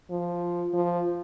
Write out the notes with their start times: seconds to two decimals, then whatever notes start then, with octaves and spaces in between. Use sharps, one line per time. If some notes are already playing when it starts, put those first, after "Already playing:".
0.11 F3
0.74 F3